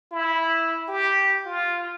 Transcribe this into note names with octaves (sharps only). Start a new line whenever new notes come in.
E4
G4
F4